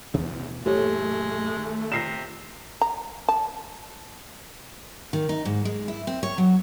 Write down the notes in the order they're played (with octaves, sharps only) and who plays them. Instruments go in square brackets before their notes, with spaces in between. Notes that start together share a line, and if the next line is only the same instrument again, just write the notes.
[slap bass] A1 B2 B3 [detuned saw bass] E2
[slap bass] F#2 A#2 E3 [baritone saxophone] G#3 [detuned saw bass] A3 [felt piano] G4 A4 C#5
[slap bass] D#3
[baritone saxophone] C3 [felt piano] A#6 C7 E7
[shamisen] A#5
A5
[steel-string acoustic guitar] D#3
D#4
G#2
G#3
E4
C4
C#5
F#3